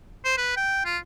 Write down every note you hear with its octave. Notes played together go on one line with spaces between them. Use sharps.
C5
B4
G5
F4